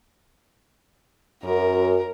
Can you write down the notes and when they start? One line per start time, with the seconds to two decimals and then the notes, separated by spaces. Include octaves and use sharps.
1.44 F#2 A#4